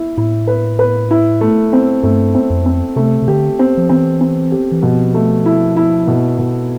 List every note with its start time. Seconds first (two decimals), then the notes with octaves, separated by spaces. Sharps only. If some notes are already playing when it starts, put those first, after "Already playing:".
Already playing: E4
0.17 A2 E4
0.47 B4
0.79 B4
1.11 E4
1.41 A3
1.73 C4
2.03 G2 A3
2.35 C4
2.50 F2
2.66 C4
2.96 C3 A3
3.22 C3
3.28 D3 G4
3.59 C4
3.77 F3
3.89 E3 C4
4.21 C4
4.52 G4
4.72 E3
4.82 B2 F3
5.14 A3
5.46 E4
5.77 E4
6.07 B2
6.38 B2